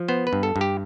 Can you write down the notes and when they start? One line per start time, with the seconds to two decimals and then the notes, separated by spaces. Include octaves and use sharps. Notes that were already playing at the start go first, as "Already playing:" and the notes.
Already playing: F3
0.08 B3 C5
0.27 B4
0.33 G2
0.43 A4
0.56 G2
0.61 G4